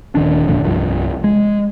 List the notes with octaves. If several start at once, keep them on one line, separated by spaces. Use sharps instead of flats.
D#1 D#3 D4
D#1 F2 A#2 D3
C2 G2 F3
G#3